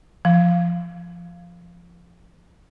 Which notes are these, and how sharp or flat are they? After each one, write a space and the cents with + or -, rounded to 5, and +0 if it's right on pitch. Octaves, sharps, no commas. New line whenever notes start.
F3 -15